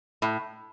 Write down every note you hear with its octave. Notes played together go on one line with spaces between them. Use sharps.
A2